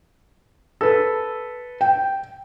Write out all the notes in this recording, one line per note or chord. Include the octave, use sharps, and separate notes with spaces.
A4 B4
G5